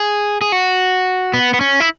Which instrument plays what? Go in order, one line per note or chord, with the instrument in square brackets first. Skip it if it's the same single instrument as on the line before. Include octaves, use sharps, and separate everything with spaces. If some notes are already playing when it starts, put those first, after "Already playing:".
Already playing: [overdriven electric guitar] G#4
G#4
F#4
B3
B3
C#4
E4